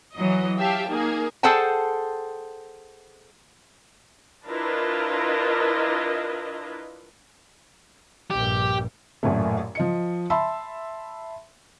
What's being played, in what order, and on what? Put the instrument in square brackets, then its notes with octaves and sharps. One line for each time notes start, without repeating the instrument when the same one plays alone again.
[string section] E3 F#3 D#5
G4 E5 F5 G5 A5
A#3 D#4 G#4
[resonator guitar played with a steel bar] G#4 A4 C5 F#5 G5 A5
[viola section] D4 E4 F4 A#4 B4 D#5
[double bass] A#1 G2 [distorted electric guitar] G4
[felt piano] A1 F#2 A#2 A3
F3 D#5 C#7
E5 A5 B5 C6 E6